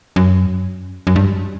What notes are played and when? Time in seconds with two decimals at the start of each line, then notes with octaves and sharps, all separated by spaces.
0.16 F#2
1.07 F#2
1.16 G2